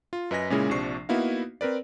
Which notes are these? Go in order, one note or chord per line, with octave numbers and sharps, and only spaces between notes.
F4
F#2 B4 D#5 G#5 A#6 B6
A#2 C#3 G#3 C#4 E4 G#4
A#1 C3 F3 D4 C#6 C7
A#3 B3 D#4 E4 F#4 F5
C4 A#4 B4 D5